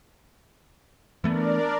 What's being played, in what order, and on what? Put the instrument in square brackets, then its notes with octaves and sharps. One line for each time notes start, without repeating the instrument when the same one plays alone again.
[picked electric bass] E3 A3 B3 [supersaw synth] D4 A#4 D5